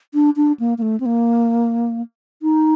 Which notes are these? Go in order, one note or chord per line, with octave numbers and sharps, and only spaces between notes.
D4
D4
A#3
A#3
A3
C4
A#3
D#4